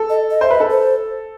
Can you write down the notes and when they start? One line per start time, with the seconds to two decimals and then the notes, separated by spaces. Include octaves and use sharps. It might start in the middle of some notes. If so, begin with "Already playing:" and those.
Already playing: A4
0.10 D#5
0.30 D#5
0.41 C5 E5
0.50 B4 D#5
0.60 A4
0.70 C5